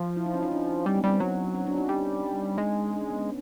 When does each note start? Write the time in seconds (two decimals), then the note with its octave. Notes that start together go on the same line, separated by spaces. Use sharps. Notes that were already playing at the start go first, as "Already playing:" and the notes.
Already playing: F3
0.17 E4
0.26 D#4
0.34 C#4
0.43 D#4
0.52 D4
0.86 G3 C4
0.97 B3
1.04 G3
1.09 C4
1.20 F#3
1.55 C#4
1.67 D4
1.78 D#4
1.89 G3
2.58 G#3 D#4
2.93 D4
3.01 C#4
3.10 B3
3.19 C#4